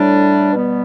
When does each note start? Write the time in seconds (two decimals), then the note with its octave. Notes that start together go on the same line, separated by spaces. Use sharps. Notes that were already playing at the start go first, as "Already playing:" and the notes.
Already playing: A2 G3 D4
0.52 B2 G3 B3